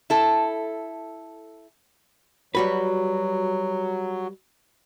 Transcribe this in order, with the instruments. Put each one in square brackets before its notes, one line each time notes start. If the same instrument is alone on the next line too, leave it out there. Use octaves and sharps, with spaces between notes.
[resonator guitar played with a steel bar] E4 A4
[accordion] F#3 [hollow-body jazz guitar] G3 F#4 B4